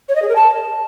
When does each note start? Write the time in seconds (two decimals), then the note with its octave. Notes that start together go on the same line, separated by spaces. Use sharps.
0.09 C#5
0.16 D#5
0.22 G#4
0.29 A#4
0.36 A5